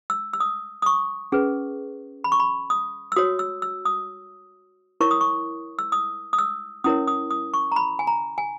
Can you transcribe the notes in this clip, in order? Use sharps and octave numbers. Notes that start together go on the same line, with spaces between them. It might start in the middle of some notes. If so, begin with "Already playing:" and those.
E6
E6
D#6
D#6
C#6
C#4 G#4 B4
B5
C#6
B5
D#6
E6
F#4 C#5 D#6
E6
E6
D#6
E4 A#4 C#5 C#6
D#6
C#6
E6
D#6
D#6
E6
C#4 E4 A#4 C#5 D#6
D#6
D#6
C#6
A#5
B5
G#5
A#5
G#5